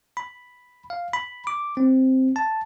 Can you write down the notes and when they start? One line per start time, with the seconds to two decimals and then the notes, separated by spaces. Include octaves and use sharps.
0.17 B5
0.90 F5
1.13 B5
1.47 D6
1.77 C4
2.36 A5